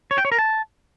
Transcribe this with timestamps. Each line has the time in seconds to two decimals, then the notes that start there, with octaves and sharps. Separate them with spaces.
0.11 C#5
0.18 G5
0.25 C#5
0.32 A#4
0.38 A5